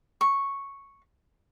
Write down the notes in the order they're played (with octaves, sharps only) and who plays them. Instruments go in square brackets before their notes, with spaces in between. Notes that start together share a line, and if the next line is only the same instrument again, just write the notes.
[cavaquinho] C#6